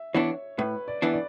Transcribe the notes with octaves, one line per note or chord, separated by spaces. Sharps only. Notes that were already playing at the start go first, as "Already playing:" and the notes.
Already playing: E5
E3 B3 D4 C#5
A2 B4
D5
E3 B3 D4
D5